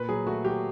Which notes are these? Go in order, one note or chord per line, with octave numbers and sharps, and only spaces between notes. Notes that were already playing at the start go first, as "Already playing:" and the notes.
Already playing: A#2 B4
F#3 G#4
A3 F#4
F#3 G4